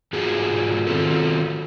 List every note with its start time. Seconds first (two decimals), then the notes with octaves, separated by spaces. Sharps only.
0.13 G#2 G#3 F4 F#4 G#4
0.87 D#3 F#3 C4 F4 F#4 A4